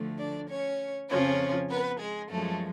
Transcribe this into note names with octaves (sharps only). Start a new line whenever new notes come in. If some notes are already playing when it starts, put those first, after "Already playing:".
Already playing: D2 D3 F3 A3
D4 D5
C#4 C#5
F2 C#3 F3 C#4 C#5
B3 B4
G#3 G#4
F#2 F3 G#3 A3 A4